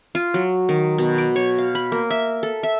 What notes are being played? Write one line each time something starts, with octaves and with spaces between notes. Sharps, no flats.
F4
F#3
D#3
B2
D6
C#5
F5
B5
A#3
E5
A4
E5